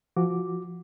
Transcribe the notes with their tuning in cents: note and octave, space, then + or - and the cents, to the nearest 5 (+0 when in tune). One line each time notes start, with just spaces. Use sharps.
F3 -15 F#4 +0 D6 +0